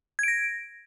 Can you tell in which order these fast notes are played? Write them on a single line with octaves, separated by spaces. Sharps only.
G#6 D7 A#6